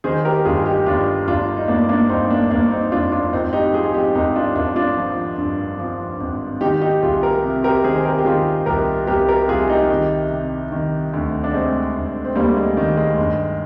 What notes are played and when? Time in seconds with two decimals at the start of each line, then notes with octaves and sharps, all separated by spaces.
0.04 D#3 G#4 C5
0.25 G4 A#4
0.45 G1 F4 G#4
0.66 D#4 G4
0.86 G1 D4 F4
1.28 G1 D4 F4
1.57 D#4
1.68 G1 A#3 D4
1.89 A#3 D4
2.09 G1 C4 D#4
2.30 A#3 D4
2.50 G1 A#3 D4
2.71 C4 D#4
2.92 F2 D4 F4
3.12 D4 F4
3.33 G#1 C4 D#4
3.53 D#4 G4
3.74 F3 F4 G#4
3.94 D#4 G4
4.15 G#1 D#4 G4
4.36 D4 F4
4.55 G#1 D4 F4
4.76 D4 F4
4.97 F3
5.38 G2
5.79 F3
6.20 G#1
6.61 D#3 D#4 G4
6.81 D#4 G4
7.02 C2 F4 G#4
7.23 G4 A#4
7.44 C3
7.64 G4 A#4
7.84 D#3 G#4 C5
7.95 C5
8.05 G4 A#4
8.18 G4
8.25 D#3 F4 G#4
8.66 C2 G4 A#4
9.07 C2 G4 A#4
9.28 G4 A#4
9.48 C2 F4 G#4
9.69 D#4 G4
9.89 D#3
10.30 C3
10.72 D#3
11.13 D2
11.44 D4
11.54 C3 G#3 C4
11.95 D2
12.25 C4
12.36 D2 G3 A#3
12.57 G#3
12.77 D#3
12.97 G#3
13.18 G1 G#3